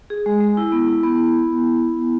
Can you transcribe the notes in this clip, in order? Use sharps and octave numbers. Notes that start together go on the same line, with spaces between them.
G#4
G#3
G#3
E4
B3
E4
B3